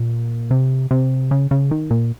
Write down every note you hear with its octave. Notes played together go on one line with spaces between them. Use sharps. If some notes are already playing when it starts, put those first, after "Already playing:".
Already playing: A#2
C3
C3
C#3
C#3
D#3
A#2